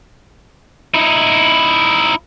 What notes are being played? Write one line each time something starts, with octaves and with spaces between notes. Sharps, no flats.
D#4 E4